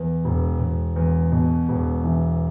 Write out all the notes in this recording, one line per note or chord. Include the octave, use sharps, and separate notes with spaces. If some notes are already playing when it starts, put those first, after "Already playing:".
Already playing: E2
E1
E1
E2
B2
E1
E3